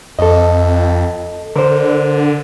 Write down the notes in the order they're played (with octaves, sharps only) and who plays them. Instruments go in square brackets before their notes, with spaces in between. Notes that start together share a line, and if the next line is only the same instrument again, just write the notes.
[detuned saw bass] F2 [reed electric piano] A4 D#5
[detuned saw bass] D3 [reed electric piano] A#4 C5